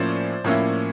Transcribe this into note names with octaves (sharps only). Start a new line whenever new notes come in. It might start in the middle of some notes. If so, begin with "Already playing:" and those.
Already playing: A2 F3 A#3 C#4 E4 C5 D5
A2 F3 A#3 C#4 E4